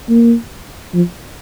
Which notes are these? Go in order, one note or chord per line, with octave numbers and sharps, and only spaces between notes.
A#3
F3